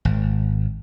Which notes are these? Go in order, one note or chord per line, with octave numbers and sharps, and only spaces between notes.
G#1